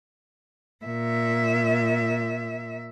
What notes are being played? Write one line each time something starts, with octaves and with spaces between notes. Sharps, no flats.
A#2 E5